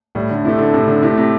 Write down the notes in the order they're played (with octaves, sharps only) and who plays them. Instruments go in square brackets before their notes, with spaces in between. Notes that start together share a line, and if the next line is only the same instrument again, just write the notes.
[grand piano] A2 [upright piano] G3
[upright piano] D3
[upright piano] C3 [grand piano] A3 E4
[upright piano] D3
[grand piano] A2 [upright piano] C3
[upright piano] D3
[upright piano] C3 [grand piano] A3 E4
[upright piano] C3